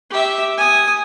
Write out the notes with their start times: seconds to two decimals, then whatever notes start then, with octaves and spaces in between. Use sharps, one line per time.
0.10 G4 E5
0.57 G#5 D#6